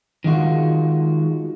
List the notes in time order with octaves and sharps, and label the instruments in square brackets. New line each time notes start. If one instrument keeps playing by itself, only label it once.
[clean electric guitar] D#3 G#3 F4 F#4